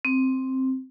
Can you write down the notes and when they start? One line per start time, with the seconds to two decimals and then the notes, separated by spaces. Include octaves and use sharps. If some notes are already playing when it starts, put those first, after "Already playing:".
0.05 C4